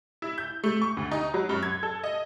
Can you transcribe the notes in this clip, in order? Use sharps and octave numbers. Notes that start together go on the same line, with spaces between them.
E4
G6
A3
C#6
D2
D#4
F#3
F#2
G#6
A4
D#5